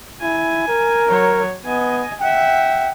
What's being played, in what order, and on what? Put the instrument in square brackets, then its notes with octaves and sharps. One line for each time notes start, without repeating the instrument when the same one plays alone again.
[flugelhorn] E4 [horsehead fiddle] G#5
[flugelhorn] A#4
[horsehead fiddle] F#3 C#5
[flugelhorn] B3 [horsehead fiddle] D#5 G#5
[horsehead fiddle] E5 F#5 [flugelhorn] G5